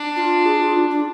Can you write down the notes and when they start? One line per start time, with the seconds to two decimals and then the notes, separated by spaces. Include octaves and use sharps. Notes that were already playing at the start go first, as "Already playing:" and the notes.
Already playing: D4
0.16 F4
0.45 G#4
0.61 F4
0.77 D4
0.90 D4